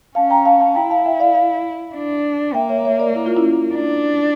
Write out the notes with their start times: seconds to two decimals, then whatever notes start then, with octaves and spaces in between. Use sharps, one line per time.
0.15 C#4 F5 A5
0.30 G5 A#5
0.45 F5 A5
0.60 F5 A5
0.75 E4 G5 A#5
0.90 F5 A5
1.05 E5 G5
1.20 D5 F5
1.35 D5 F5
1.95 D4
2.54 A#3 E5 G5
2.69 C#5 E5
2.85 C#5 E5
2.99 A#4 D5
3.15 E4
3.26 F4
3.36 C#4 E4
3.74 D4